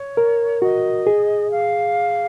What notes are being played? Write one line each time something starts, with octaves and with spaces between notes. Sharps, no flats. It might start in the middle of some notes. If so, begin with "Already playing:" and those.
Already playing: C#5
A#4
F#4 D#5
G#4
F5